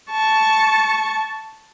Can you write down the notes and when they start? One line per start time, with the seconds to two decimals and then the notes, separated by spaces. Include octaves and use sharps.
0.12 A5 C#6